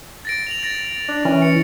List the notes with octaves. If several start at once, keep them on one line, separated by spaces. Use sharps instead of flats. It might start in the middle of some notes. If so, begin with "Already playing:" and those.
A6 A#6 D7
F7 F#7
A6 A#6
D4
E3 C#4
C#7